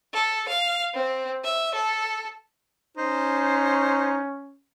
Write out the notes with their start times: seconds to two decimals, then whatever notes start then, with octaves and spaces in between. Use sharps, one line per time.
0.13 A4
0.48 F5
0.94 C4
1.44 E5
1.74 A4
2.97 C#4 D#4 C5